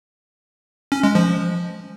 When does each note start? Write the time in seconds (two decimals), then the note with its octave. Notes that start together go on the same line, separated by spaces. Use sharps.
0.92 C#4
1.03 G#3
1.15 F3